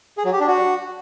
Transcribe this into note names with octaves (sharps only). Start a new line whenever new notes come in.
G#4
F#3
G4
D4
F#4